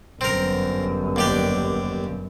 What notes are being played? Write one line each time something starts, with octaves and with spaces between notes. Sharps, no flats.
G1 F#2 C4 A#4
D#2 D4 G4